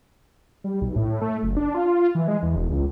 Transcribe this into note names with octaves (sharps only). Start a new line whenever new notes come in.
G3
B1
A2
A3
F#1
D4
F4
E3
G#3
E2
E1
C#2